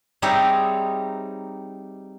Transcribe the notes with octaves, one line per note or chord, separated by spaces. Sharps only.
G3 C4 D#4 G#4 C#5 E5